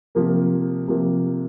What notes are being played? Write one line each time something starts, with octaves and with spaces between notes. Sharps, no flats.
C3 F3 A#3
C3 F3 A#3